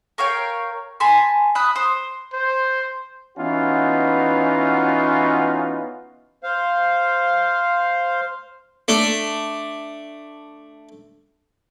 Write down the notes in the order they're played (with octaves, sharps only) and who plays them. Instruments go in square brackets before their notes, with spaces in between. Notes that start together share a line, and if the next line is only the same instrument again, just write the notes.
[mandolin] A#4 C#5 F5 G5
G#5 A5 B5 C6
B5 D#6 E6 F#6
C5
[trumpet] C5
[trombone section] E3 B3 C#4 D#4 F4 F#4
[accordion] C5 F5
[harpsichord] A3 D4